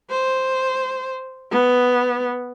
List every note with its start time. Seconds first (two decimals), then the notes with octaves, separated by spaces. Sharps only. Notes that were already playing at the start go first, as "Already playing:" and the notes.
0.10 C5
1.51 B3